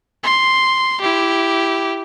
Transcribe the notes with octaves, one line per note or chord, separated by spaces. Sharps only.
C6
E4 G4